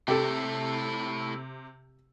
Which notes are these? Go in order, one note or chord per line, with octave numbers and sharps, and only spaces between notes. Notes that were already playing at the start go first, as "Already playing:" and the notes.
C3 A3 E4 G4 A4